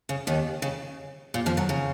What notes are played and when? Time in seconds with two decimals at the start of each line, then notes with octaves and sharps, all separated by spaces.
0.09 C#3
0.27 D#2 D#3
0.62 C#3
1.34 A#2
1.46 F2 F3
1.57 F#2 F#3
1.69 C#3